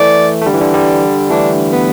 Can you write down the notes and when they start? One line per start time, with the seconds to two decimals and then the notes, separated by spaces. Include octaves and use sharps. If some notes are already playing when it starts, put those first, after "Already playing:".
Already playing: E3 A3 D5
0.41 A3
0.46 D3 G3
0.54 E3
0.61 D3
0.74 D3 G3
1.30 E3 A3 D4
1.73 B3